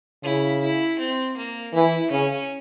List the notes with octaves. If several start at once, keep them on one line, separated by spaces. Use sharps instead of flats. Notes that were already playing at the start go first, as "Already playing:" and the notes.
C#3 E4
E4
C4
A#3
E3 E4
C#3 C#4